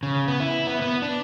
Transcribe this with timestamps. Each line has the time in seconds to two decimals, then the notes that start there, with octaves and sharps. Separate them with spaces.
0.03 C#3
0.28 B3
0.40 E4
0.67 B3
0.82 B3
1.02 D4